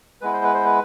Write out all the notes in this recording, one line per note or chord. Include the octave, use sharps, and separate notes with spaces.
G#3 B3 E4 B4
C5
B4
C5
B4